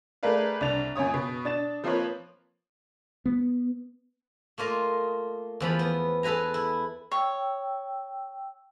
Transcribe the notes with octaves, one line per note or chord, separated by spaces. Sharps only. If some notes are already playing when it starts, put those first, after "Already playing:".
A3 G#4 A#4 B4 D5 F5
C2 D4 A6 F7
F#2 A#2 C#5 D#6
B2
D4 A6 E7
F3 A#3 C4 F4 B4 C#5
B3
A3 A#3 F4 D#5
E2 F3 B5
B3
G#4 A4 B4 G#5 A#5
E4
C#5 G5 E6